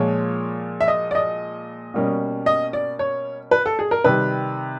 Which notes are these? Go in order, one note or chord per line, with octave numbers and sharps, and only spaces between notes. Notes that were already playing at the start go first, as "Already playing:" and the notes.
Already playing: A#2 F3 G#3 C#5
E5
D#5
D5
D#5
B2 G3 A#3 C#4
D#5
D5
C#5
B4
A4
G#4
A#4
C3 D#3 G3 B4